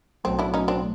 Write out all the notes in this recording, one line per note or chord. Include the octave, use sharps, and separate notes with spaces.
B1 A2 F#3 A3 C4
D4 E4
C#4 D#4
C4 D4